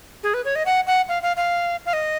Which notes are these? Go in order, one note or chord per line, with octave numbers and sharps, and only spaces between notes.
G#4
B4
C#5
D#5
F#5
F#5
F5
F5
F5
F5
D#5